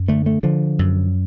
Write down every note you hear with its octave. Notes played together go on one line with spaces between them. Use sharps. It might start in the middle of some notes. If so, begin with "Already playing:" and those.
Already playing: F#2
D3 A3
A3
D3 F3
F#2